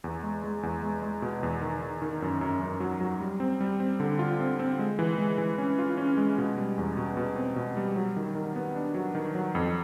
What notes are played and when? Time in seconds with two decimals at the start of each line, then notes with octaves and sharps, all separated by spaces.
0.04 E2
0.23 G#3
0.44 G#3
0.63 E2
0.83 G#3
1.02 G#3
1.22 B2
1.43 E2
1.61 D#3
1.82 D#3
2.02 D#3
2.22 F#2
2.41 F#2
2.62 F#2
2.80 F#3
3.01 F#3
3.20 G3
3.40 C4
3.60 G3
3.80 C4
4.00 D3
4.19 F4
4.39 C4
4.59 C4
4.79 G#3
4.99 E3
5.18 G#3
5.38 E3
5.58 C#4
5.79 F4
5.97 C#4
6.17 G#3
6.38 B2
6.57 G3
6.78 E2
6.97 B2
7.17 B2
7.36 C4
7.56 B2
7.77 G3
7.96 F#3
8.16 D#3
8.35 D#3
8.56 B3
8.76 D4
8.95 F#3
9.15 D#3
9.35 F#3
9.55 F2